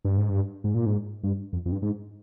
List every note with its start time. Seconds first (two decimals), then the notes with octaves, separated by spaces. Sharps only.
0.05 G2
0.18 G#2
0.30 G2
0.64 G#2
0.74 A#2
0.86 G#2
1.23 G2
1.53 F2
1.66 F2
1.72 G2
1.82 G#2